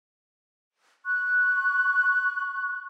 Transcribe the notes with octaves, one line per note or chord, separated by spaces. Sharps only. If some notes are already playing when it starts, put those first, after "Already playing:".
C#6 F#6